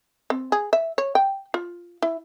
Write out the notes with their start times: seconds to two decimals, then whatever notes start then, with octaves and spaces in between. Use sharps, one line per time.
0.30 C4
0.52 G#4
0.73 E5
0.98 C#5
1.15 G5
1.54 F4
2.02 E4